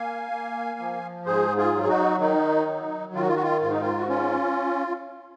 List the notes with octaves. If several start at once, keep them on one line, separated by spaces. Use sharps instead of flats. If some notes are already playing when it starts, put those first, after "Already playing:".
Already playing: A#3 F5 G#5
A#3
F3
G#2 G#4 C5
F4 G#4
F#3
G#4
D#4 F#4
D#3 D#4
F#3
D#3 F4
F#4
F4
F#4
F4
G#2 F4
D#4
F4
F#4
C#4 F4